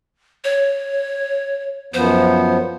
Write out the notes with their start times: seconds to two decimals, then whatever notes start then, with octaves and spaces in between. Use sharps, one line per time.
0.44 C#5
1.94 F#2 F3 B3 C5